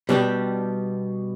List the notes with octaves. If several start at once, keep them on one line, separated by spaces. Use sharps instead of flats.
B2 G3 D4 G4